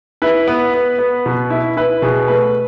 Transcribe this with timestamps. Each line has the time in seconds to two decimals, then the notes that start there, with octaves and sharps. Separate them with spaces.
0.22 E4 B4
0.48 B3
0.74 B3
0.99 B3
1.26 B2
1.50 E4
1.77 E4 B4
2.02 B2 G#4
2.28 A3 B4